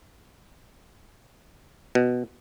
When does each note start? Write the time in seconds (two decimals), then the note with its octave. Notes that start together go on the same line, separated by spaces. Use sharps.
1.95 B2